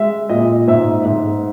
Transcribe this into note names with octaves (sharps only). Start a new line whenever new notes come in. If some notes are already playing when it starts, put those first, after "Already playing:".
Already playing: G#3 E5
A#2 D#5
G#2 E5
G#2